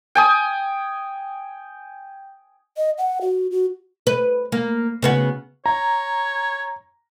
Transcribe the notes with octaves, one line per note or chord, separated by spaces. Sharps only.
G5 G#5 D#6
D#5
F#5
F#4
F#4
B4
A#3
C#3 B3 F#4
C#5 A#5